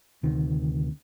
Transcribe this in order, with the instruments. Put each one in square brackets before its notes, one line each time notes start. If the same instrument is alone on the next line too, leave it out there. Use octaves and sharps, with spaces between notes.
[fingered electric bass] D2 C3 D#3